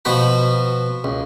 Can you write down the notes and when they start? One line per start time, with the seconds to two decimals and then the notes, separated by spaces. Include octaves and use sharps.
0.05 B2 F3 B3 F#4 F#5 B5
1.04 C#2